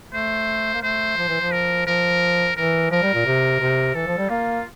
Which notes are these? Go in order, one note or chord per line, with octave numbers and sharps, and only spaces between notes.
A3 C5
A#3
A3 C5
F3
E3
F3
A#4
F3 A#4
E3 A#4
F3 A#4
G3
A#2
C3
C3
E3 A4
F3
G3
A#3 F4